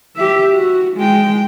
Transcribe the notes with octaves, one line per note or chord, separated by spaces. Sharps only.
G4 E5
F#4
G#3 G5